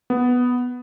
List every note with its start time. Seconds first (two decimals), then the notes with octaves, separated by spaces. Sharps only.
0.10 B3